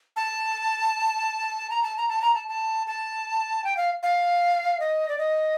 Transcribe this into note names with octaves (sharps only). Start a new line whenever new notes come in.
A5
A#5
A5
A#5
A5
A#5
A5
A5
A5
G5
F5
F5
D#5
D5
D#5